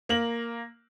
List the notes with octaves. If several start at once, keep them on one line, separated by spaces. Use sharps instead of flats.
A#3 F#7